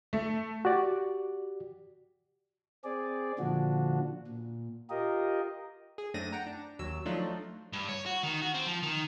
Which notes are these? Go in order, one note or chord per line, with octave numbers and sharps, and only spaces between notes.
A3
F#4 G4 D5
C4 G#4 D5
A#2 D3 F3 D4 F#4
A#2
F4 G4 A#4 D#5
G#4
F#2 A3 C4 D4 A#6 D#7
F#5 G5 A#5
D4
D#2 F#3 E6
F3 F#3 A3 D4 D#4 F4
G2
C#5
F#4
D#3
F#4
C4
F3
D#3